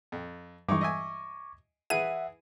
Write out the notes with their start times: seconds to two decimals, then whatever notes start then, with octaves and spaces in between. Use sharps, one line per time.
0.12 F2
0.69 G2 E3 G#3 D#4 C#6 D6
0.81 D#5 E5 G#5
1.90 E3 E4 G#4 E5 F#5 D#7